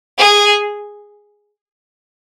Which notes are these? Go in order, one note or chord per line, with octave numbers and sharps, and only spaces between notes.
G#4